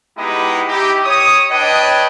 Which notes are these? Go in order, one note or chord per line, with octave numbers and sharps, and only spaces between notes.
G#3 B3 D#4 E4 G4
D#4 E4 G4
C#5 D#6
D4 B4 C#5 D#5 G5